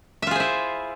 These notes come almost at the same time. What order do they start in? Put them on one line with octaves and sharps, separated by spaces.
E5 F4 G#4 C5 E4